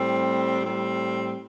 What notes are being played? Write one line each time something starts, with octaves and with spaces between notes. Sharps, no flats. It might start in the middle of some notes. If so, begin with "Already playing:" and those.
Already playing: A2 G3 C4
A2 G3 C4